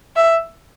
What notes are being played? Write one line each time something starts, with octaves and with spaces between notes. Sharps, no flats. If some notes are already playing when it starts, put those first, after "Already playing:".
E5